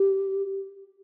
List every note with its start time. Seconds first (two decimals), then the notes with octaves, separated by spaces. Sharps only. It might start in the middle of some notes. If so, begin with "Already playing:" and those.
Already playing: G4